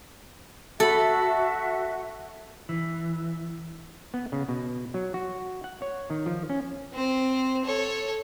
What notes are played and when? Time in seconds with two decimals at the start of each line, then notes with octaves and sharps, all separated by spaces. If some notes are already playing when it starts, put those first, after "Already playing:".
0.80 F#4 A4 E5 B5
2.69 E3
4.14 B3
4.32 C#3
4.48 B2
4.94 F#3
5.14 F#4
5.64 F#5
5.82 C#5
6.10 D#3
6.26 F3
6.50 C#4
6.93 C4 C5
7.65 A4 C#5